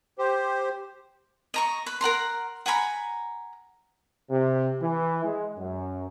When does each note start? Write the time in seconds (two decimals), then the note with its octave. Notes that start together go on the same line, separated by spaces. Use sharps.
0.18 G4 C5
1.54 D#5 A#5 C#6
1.86 B4
2.01 A#4 F#5 A#5 C6
2.66 F#5 G#5 A#5 B5
4.30 C3
4.81 E3
5.24 G#3
5.58 F#2